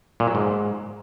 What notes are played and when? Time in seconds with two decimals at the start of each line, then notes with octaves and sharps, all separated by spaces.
0.20 A#2
0.27 F#3
0.35 G#2